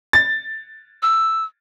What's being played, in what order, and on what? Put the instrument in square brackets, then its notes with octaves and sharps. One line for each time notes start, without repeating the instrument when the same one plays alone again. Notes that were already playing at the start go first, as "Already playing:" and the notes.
[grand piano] A6
[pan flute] E6